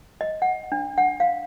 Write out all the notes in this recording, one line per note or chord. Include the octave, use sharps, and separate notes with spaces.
D#5
F#5
D4
F#5
F5